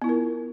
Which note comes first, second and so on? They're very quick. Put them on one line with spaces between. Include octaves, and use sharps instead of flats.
B3 E4 F4 A#4